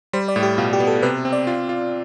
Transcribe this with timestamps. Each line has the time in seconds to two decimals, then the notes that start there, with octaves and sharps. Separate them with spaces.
0.13 G3 C5
0.28 D5
0.36 A2
0.43 G4
0.58 B2 F4
0.73 G4
0.80 B3
0.87 A4
1.02 C3 B4
1.25 C4
1.33 D5
1.47 F4
1.69 F4